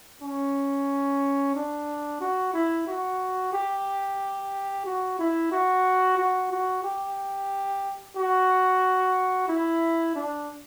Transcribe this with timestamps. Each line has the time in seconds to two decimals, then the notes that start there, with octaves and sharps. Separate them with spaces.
0.21 C#4
1.55 D4
2.20 F#4
2.53 E4
2.87 F#4
3.53 G4
4.85 F#4
5.18 E4
5.51 F#4
6.17 F#4
6.51 F#4
6.83 G4
8.16 F#4
9.48 E4
10.15 D4